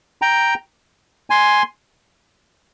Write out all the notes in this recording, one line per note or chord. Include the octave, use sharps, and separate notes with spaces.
G5 A#5
G#5 C6